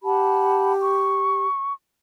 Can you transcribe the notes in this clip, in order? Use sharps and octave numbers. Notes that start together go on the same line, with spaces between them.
G4 F#5 A5 B5
C#6